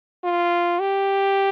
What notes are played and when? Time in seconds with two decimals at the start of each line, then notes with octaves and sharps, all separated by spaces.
0.24 F4
0.80 G4